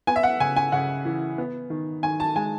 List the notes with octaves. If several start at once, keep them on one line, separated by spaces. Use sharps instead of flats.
B3 G#5
E5
F#5
C#3 G#5
G#5
C#3 F#5
E3
B3
D#3
D#3 G#5
A5
G#3 G#5